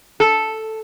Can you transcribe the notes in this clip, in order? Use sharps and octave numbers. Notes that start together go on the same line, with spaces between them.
A4